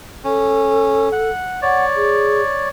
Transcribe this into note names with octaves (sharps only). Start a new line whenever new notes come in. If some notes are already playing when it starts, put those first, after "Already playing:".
C#4 A4
F#5
C#5 D5 F#5
G#4